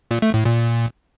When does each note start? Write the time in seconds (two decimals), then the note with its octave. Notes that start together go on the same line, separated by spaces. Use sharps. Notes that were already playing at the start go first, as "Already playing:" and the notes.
0.11 A#2
0.22 A3
0.34 A2
0.45 A#2